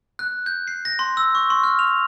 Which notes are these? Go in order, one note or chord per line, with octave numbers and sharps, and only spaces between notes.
F#6
G6
C7
A#6
C6
E6
C#6
C6
F6
F7